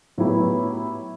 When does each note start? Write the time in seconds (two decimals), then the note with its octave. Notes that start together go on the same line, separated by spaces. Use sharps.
0.18 A2 F#3 B3 E4 G4